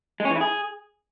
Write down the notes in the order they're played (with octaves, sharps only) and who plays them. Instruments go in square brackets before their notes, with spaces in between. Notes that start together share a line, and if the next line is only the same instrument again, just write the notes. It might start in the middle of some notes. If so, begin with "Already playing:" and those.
[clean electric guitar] G#3
C#4
E3
E4
G#4